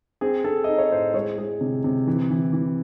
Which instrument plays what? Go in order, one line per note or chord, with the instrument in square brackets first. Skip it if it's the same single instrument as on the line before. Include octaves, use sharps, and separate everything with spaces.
[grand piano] C4 G#4
C4 A4
D#4 D#5
C#5
A2 C5
G#3 C#5
G#3
C3
C3
E3
E3
E3